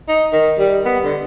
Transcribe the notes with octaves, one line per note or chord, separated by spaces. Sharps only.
D#4
D#3
G3
B3
D3